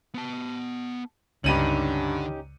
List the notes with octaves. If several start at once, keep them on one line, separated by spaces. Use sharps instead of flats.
B3 A5
C#2 G2 D3 C#4 D#4 G4 D#7 F#7